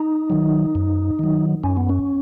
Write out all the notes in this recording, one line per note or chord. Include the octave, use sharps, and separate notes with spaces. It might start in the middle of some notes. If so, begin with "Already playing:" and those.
Already playing: D#4
D#3 F#3
F#2
D#3 F#3
F#2 C#4
B3
C#4